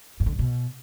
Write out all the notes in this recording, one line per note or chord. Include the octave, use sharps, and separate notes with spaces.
G2
D3
G#2
B2